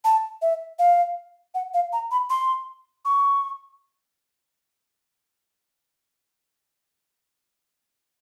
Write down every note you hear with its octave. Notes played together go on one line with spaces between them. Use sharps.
A5
E5
F5
F#5
F5
A#5
B5
C6
C#6